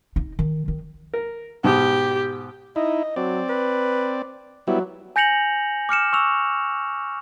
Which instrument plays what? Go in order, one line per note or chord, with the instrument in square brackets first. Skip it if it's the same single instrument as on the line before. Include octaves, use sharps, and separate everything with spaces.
[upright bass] D#4
D#3
D#3
[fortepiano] A#4
[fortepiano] G#2 B2 [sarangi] G4
[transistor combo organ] D#4 E4 [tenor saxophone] D#5
[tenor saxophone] F#3 [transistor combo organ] C4 D5
[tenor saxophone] B4
[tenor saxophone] F#3 [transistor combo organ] G3 B3 E4
[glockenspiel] G#5 G6 A#6 C#7 F7 F#7
D6 F6 C#7 E7
C#6 E6 F7